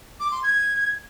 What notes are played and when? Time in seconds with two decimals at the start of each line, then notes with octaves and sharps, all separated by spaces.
0.20 D6
0.31 C6
0.43 G#6